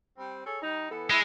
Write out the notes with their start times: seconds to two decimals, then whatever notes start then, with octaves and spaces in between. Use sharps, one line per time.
0.18 G3 C4
0.46 G#4 A4 C#5
0.62 G3 D#4
0.91 E3 B3 A4
1.10 G#3 E4